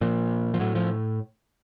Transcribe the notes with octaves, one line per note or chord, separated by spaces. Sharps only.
A#2 F3
F3
A2 F#3
F3